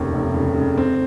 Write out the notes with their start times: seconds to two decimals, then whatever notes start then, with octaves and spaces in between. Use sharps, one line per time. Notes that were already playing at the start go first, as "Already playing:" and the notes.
Already playing: F1 D#2 C#3
0.13 F1
0.34 C#3
0.55 C#3
0.77 C4